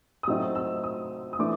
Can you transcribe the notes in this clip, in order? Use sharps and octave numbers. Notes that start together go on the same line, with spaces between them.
D#6
A2 F#3 A3 C4 D#4 E6
E6
D#6
D#6
E3 A3 D4 D6